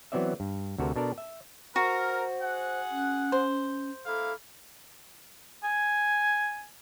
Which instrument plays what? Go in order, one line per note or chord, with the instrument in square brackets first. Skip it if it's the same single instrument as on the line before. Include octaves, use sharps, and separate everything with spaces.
[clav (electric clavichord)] E3 F#3 B3 C4 D5 E5
G2
D2 C3 F#4 A4 A#4
B2 D4 A4 A#4 D5
E5
[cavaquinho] F#4 [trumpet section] A#4 [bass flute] C5
[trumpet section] G#4 F#5
[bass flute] C#4
[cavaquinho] C5
[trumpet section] A#3 E4 F5 [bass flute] A4
[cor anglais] G#5